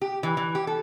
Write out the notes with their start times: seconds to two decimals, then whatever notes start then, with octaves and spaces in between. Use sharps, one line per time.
0.02 G4
0.23 E3
0.37 E3
0.55 G4
0.67 A4